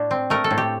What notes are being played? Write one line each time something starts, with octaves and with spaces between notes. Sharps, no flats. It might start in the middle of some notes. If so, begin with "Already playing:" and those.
Already playing: A2 D4
C4
A3 A#4
A4
A2
G4